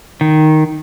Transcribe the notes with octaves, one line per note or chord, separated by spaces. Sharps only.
D#3